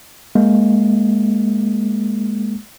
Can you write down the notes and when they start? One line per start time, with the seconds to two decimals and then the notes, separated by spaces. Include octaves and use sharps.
0.35 G#3 A#3